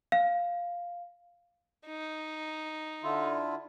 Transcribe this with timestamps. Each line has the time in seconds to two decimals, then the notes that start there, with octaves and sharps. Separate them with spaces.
0.12 F5
1.87 D#4
3.04 D3 E4 F4